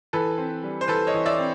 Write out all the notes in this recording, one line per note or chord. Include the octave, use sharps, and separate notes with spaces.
E3 A4 B4
C4
G3
C5
E3 A4 B4
C#5 D#5
E3
D5 E5
C4